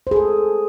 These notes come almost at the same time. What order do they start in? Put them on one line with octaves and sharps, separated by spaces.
C5 G#4 A4